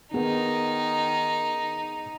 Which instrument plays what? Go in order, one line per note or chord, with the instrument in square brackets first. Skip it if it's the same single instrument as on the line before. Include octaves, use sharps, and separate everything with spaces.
[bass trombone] D#3 [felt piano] B3 G#4 [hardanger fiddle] D#4